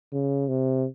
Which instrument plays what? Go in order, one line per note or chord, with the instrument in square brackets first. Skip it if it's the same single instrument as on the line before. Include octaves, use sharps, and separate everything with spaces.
[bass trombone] C#3
C3